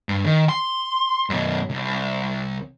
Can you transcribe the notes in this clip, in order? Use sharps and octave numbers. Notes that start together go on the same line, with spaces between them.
G2
D#3
C6
F#2 B2
C2